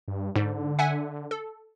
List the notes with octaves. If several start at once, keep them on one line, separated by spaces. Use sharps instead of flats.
G2
G#2 D3
E5 F#5 G#5
A4